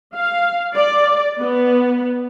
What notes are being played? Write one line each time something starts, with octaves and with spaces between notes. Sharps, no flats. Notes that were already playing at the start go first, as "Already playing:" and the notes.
F5
D5
B3